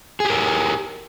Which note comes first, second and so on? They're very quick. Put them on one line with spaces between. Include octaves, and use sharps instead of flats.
G#4 G4 A#4